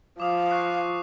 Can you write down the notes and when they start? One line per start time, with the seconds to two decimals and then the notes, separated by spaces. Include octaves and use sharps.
0.20 F3 F5 D6 D#6
0.51 C#6 F#6 C7